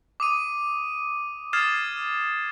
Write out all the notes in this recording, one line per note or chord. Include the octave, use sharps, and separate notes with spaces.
D6 D#6 D#7
D#6 F6 G#6 A6 C7 E7